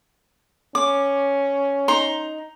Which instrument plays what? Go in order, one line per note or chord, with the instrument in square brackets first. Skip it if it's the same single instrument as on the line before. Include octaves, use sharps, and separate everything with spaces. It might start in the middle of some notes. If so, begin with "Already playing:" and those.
[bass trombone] C#4 [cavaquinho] D6
[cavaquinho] D#4 A#5 C6